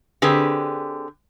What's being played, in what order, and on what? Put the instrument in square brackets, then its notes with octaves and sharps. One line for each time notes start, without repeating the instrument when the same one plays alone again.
[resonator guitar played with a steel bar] D3 C4 G4 G#4 B4